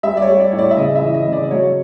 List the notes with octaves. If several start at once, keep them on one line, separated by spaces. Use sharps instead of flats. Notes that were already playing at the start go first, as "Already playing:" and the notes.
G3 E5
D5
C#5
G3
D5
A2 C#5
D5
E5
C#3 D#5
E5
E3
D#5
C#3
D5
F#3 C#5